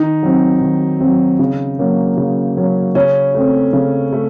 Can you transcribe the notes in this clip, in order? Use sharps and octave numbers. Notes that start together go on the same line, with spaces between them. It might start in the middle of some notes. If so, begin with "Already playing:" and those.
Already playing: D#3 D#4
F#3 C4
D#3
F#3 C4
C#3
F#3 A#3 C#4
C#3
F#3 A#3 C#4
C#3 C#4
A3 C4
C#3
A3